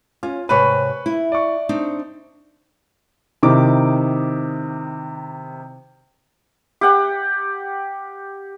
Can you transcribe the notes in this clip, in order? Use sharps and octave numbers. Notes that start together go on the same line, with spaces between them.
C#4 F4
G#2 C3 B4 C#5 B5 C#6
E4
D5 C#6
C4 D4 D#4
C3 D#3 D#4 E4 D6
G4 F#5